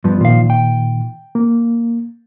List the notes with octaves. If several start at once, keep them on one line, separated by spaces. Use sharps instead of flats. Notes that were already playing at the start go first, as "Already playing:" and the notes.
G2 F3 B3
A#2 D#3 F3 F5
G5
A#3